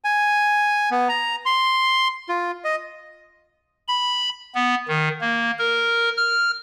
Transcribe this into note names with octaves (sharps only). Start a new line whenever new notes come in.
G#5
B3
A#5
C6
F4
D#5
B5
B3
D#3
A#3
A#4
F6